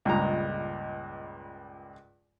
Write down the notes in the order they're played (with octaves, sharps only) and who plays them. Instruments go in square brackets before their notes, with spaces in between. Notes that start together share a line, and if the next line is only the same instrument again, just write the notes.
[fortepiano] C#2 G2 A#2 G#3 A#5